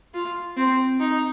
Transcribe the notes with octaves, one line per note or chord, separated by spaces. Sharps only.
F4
C4
D#4